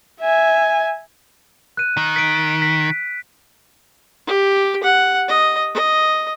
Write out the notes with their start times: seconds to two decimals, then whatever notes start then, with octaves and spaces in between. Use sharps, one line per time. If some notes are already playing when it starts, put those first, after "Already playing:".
0.20 E5 G#5
1.77 F#6 D#7
1.97 D#3
2.16 B6 D7
2.62 B6
4.27 G4
4.83 F#5
5.28 D#5
5.74 D#5